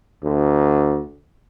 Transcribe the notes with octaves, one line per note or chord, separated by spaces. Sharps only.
D2